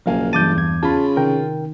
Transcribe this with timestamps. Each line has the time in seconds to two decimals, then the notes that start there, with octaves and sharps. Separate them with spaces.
0.06 F#1 B1 F3 A#4 F5 G#5
0.33 G2 E3 A5 D6 G6 A6 D#7
0.55 E2 G#6
0.83 C#3 F4 A5 B5
1.16 C3 D#3 A#4 G5